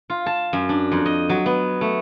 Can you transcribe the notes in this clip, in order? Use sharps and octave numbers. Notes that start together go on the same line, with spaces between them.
F4
A5
F#2
D4
F2
D#5
F#3
B3
A3